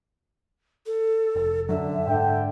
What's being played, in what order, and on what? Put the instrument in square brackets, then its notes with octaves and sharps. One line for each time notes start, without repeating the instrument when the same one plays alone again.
[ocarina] A4
[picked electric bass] F1
[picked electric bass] F#2 F#3 [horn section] D3 [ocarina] E5
[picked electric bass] G#2 [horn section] D3 G5